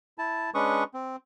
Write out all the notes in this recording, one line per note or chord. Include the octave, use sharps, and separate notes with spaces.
E4 A5
G#3 C#4 D4 B4 C#6 D#6
C4